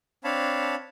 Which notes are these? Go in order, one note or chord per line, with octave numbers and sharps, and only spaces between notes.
C4 D4 C#5 F5 A5 B5